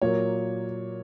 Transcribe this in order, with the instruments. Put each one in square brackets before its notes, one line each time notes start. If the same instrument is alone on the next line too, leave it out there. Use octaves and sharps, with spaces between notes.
[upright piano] A#2 F#3 A#3 C#5